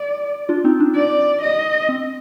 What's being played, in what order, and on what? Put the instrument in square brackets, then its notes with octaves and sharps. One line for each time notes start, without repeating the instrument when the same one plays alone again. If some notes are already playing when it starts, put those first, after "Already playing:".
Already playing: [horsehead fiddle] D5
[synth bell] D4 F4
C4 D#4
D4
[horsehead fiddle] D5
D#5
[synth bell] C4